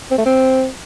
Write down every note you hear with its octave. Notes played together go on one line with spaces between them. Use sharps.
C4
A3
C4